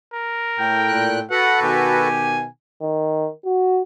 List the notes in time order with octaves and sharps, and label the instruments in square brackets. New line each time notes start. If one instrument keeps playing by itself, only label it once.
[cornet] A#4
[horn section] A2 G5
[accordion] A#2 F#6
[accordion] F#4 A4 B4 [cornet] F#5
[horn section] B2 D#3 G#5 [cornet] G4
[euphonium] D#3
F#4